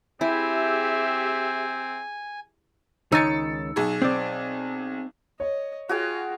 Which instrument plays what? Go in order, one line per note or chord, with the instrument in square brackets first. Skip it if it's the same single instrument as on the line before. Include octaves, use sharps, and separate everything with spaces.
[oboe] C4 [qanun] E4 [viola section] G4 G#4 E5 [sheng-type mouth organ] G#5
[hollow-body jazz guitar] C#2 D#3 C#5 [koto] D#4 G#5 [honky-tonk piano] E6 A6 C#7
[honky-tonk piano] B1 G#4
[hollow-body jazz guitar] C4 D5
[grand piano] C#5 [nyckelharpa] D#5
[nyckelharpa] F4 [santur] F#4 G#4 G5